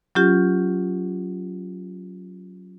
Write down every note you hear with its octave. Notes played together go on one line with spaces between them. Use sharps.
F#3 C#4 F4 G4